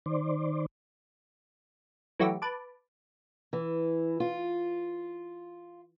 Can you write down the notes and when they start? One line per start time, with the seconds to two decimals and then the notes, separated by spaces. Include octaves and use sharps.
0.06 D#3 C5 D5
2.19 E3 F#3 A3 F#4 G4
2.42 B4 A5 D6
3.53 E3
4.20 F4